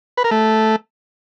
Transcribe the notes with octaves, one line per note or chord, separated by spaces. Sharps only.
B4
A#4
A3